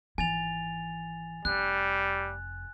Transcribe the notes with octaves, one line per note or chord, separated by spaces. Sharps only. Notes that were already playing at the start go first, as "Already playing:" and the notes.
G#1 E3 G#5 A6 F7
F1 G3 F#6